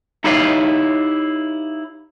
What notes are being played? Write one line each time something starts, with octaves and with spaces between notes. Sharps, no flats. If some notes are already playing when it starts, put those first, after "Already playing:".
D#4 E4 G4 B4 C#5 F5